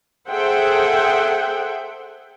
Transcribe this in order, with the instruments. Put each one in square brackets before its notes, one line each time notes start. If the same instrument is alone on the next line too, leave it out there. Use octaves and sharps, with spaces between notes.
[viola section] G#4 A4 C5 E5 F#5 G5